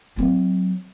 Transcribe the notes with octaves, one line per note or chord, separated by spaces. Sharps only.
F#3 C4